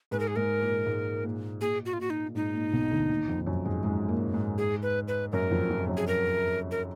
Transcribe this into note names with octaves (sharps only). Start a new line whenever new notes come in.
G#2 G#3 B4
A#4
G#4
G#2 G#3 A#4
A#2 A#3
G#2 G#3
A#2
A#2 G#4
F#4
F4
A#2 F#4
D#4
A#2
G#2 D#4
A#2
B1 B2
D2 D3
D#2 D#3
F2 F3
F#2 F#3
G#2 G#3
G#2 G#3
A#2 A#3
G#2 G#3
G#4
B4
B4
F#2 F#3 A#4
F2 F3
F2 F3
F#2 F#3
G#4
A#4
A#4